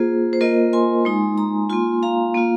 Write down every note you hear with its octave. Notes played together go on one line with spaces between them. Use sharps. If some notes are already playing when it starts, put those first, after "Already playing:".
Already playing: A#3 F4 G#4 C5
C5
A#3 F4 A#4 D#5
G#5 C6
G#3 D#4
A#5 D#6
A#3 F4 G#5 C6
F5 A#5
A#3 F4